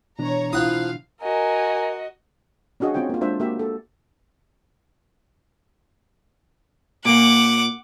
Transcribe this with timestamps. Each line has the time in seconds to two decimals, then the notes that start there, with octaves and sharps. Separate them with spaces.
0.19 B2 E3 D4 C#5 A#5
0.53 F3 E4 F5 F#5 D#6
1.22 F#4 A#4 D#5 G#5
2.80 C#4 D4 F#4 G#4 D#5 F5
2.94 C4 C#4 F4 C#5 G5
3.09 A#3 F4
3.21 G#3 D4 F4 C5 E5
3.40 A#3 F#4 G4 E5
3.59 A4
7.05 A#2 A#3 F#5 D6